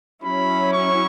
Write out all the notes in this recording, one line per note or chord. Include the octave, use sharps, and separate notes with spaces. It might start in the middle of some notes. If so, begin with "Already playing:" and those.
F#3 C#4 E4 B5
C#6